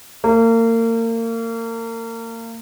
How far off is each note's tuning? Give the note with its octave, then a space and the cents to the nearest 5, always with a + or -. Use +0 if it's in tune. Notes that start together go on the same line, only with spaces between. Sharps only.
A#3 -35